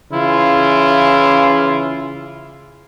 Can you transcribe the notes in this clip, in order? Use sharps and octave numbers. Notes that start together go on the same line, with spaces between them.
C#3 E3 E4 F4